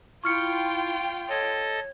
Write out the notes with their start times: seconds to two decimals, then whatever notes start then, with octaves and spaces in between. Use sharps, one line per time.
0.24 E4 F4 G5 C#6 F6 C#7
1.29 A4 C#5 D#5